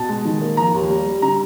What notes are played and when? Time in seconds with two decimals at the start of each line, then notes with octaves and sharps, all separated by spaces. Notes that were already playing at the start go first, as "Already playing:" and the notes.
Already playing: B2 A5
0.09 G#3
0.25 D#3
0.42 A#3
0.57 F3 A#5
0.73 D#2
0.90 G3
1.06 G3
1.22 D3 A#5